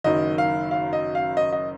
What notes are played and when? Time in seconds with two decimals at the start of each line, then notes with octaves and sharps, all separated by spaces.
0.04 F#1 F#2 D#3 D#5
0.38 F5
0.71 F5
0.93 D#5
1.15 F5
1.37 D#5
1.52 D#5